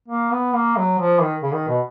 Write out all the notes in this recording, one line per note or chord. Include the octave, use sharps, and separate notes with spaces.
A#3
B3
A#3
F#3
F3
D#3
C#3
D#3
B2